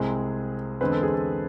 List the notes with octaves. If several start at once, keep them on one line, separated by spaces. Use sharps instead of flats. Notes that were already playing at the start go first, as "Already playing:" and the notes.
Already playing: C2 C3 G#3 C4 G#4
E2 D3 G#3 C4 B4
A4
G#4
A4